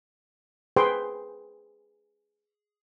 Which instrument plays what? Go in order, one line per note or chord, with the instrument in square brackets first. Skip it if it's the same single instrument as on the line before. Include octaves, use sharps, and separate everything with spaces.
[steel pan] G#4 B4 C5 G5 C6